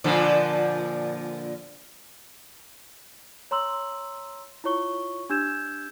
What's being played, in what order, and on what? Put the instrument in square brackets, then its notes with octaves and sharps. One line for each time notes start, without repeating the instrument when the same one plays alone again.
[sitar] A#2 D3 F3
[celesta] C#5 A#5 C6 E6 F#7
E4 F4 C#5 C#6 G7
D4 G4 E6 G6 G#6 E7